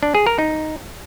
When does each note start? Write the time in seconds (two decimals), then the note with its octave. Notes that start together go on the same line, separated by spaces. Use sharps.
0.03 D4
0.15 G#4
0.27 A#4
0.39 D#4